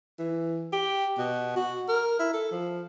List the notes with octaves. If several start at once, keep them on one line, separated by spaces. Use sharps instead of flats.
E3
G4
B2
F#4
A#4
E4
A4
F3